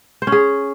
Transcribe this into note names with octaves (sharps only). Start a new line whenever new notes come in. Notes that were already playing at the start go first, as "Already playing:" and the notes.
C5
C#4
G#4